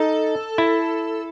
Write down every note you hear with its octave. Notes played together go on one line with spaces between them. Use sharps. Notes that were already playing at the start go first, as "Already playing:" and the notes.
Already playing: D#4 A4
E4